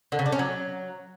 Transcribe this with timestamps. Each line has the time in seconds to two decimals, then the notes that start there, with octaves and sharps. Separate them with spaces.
0.12 D3
0.19 C#3
0.26 D4
0.32 C#4
0.39 F#3